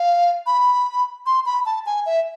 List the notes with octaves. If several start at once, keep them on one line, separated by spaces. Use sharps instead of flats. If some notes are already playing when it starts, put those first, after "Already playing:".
Already playing: F5
B5
C6
B5
A5
G#5
E5